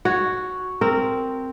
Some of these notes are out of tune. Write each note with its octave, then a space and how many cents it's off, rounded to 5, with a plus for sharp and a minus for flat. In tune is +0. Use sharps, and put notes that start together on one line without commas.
F#4 +0 C#5 +0
C4 +0 A#4 -15